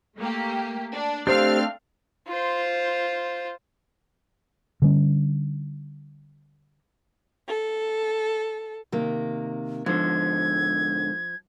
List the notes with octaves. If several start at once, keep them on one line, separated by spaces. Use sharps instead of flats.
A3 A#3 G4
D4
A3 C4 D4 G4 C5 F5 F6
F4 C5
D3 G3 C#4
A4
C3 D#3 A#3
G#2 D3 F3 G#6